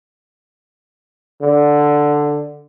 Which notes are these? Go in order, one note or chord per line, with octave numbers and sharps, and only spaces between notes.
D3